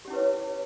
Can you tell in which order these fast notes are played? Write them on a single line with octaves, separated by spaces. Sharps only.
G4 C#4 E4 B4 C#5